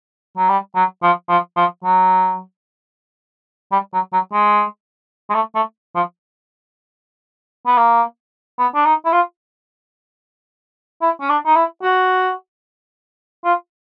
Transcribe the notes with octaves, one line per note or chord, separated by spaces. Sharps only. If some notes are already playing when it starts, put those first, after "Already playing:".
F#3
G3
F#3
F3
F3
F3
F#3
G3
F#3
F#3
G#3
G#3
A3
A3
F3
B3
A#3
B3
D4
D#4
E4
F4
E4
C#4
D4
D#4
E4
F#4
F4